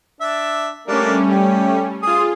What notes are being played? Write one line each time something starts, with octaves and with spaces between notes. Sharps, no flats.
D4 E5
G3 A3 A#3 C#4 D4
G4
F4 G#4 D#6